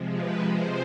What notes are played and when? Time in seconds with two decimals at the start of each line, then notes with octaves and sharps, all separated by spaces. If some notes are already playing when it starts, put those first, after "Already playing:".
Already playing: C3 F3 G#3
0.15 B4
0.44 C5